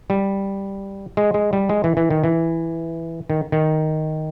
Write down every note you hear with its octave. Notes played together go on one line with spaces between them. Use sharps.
G3
G#3
G#3
G3
G#3
E3
E3
D#3
E3
D#3
D#3